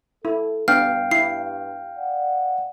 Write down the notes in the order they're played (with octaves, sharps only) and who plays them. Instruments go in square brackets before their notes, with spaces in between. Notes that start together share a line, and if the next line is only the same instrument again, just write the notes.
[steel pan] E4 [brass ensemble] A4
[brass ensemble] G2 [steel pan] B3 D4 [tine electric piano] F5 G5 [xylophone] F6
[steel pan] E4 [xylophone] C7
[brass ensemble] D5 F#5